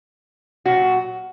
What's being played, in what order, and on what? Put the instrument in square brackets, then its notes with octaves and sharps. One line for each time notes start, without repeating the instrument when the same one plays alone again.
[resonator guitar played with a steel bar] A#2 F#3 F#4